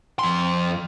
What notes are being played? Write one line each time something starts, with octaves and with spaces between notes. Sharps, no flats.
F2 C6